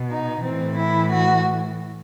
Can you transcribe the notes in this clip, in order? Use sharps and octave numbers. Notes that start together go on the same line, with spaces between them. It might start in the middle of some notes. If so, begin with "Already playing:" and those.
Already playing: B2
D#4
A2 E3 C4
E4
F#4